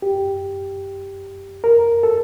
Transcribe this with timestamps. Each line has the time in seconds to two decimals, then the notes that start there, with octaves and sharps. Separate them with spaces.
0.02 G4
1.64 A#4
2.03 A4